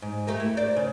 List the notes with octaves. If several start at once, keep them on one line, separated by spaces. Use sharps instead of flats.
G#2
A3 G4 A#4
E4
C5 D5
C#3